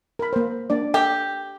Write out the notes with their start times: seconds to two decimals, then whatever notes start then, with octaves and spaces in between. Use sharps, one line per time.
0.19 A#4 B5
0.33 A#3 C5
0.70 A#3 D4 D5
0.94 G4 A4